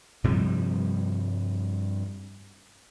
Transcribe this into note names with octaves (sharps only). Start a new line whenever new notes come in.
G2 C3 F3 G3